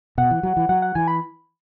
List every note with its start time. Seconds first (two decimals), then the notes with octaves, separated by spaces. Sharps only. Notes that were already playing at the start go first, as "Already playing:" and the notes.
0.18 B2 F#5
0.31 E3
0.43 F#3
0.57 E3
0.69 F#3 F#5
0.82 F#5
0.95 E3 G#5
1.08 B5